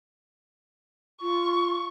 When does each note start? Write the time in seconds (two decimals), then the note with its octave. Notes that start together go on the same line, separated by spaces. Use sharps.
1.22 F4 C#6